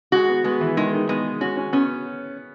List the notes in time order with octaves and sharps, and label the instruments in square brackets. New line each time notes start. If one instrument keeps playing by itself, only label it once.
[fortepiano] G#3 [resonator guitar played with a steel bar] F#4
[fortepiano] B3
[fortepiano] G#3 [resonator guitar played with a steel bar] B3
[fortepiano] E3
[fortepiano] D#3 [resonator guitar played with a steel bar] G#3
[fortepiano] D#3
[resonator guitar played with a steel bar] G#3 [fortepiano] B3
[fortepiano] C#4 [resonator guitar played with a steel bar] F#4
[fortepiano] C#4
[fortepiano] B3 [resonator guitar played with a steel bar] C#4